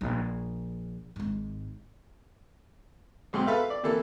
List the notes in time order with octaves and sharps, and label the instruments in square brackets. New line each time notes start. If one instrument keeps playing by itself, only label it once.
[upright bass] A#1
G#1 G#2
[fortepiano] B1 G#2 C4 C6
A4 B4 E5 F5
D5
C3 E3 A#3 A4